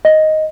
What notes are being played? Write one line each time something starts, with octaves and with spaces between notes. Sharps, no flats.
D#5